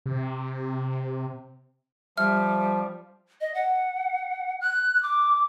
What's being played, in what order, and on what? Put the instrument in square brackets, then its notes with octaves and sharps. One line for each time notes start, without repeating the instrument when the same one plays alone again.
[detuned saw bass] C3
[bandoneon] F3 [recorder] G3 [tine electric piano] E5 [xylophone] F6
[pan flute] D#5
F#5
F#6
D6